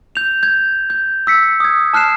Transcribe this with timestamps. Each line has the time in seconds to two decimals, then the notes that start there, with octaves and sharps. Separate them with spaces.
0.15 G6 F7
0.43 G6 G#6
0.90 G6
1.27 E6 B6 C#7
1.60 D#6 G#6
1.93 A5 F6 F#6 C7 E7